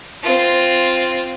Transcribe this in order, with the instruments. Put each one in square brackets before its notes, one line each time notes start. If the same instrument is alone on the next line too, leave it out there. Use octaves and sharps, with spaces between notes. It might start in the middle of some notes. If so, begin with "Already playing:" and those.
[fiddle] C4 F4